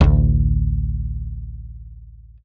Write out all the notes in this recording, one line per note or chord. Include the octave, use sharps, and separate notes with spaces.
A1 D2